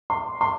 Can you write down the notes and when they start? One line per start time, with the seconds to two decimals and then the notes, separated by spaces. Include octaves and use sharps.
0.10 C6
0.41 C6